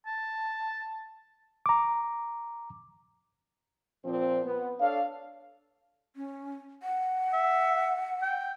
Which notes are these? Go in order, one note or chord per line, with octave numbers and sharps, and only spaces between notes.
A5
A#5 D6
A#2 F3 C4
B3
D4 A4 C#5 F5
C#4
F#5
E5
G5